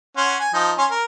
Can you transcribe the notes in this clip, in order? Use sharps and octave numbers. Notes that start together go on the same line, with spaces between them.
C#4 F#5 C6
G#5
F3 D#4
C#4 G#5 C6
A#4